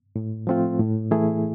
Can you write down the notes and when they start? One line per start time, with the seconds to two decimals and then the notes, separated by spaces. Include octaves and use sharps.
0.16 A2
0.47 F3 A3 C4 F4
0.79 A2
1.11 E3 A3 E4 G#4